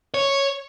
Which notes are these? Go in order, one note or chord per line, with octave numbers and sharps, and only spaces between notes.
C#5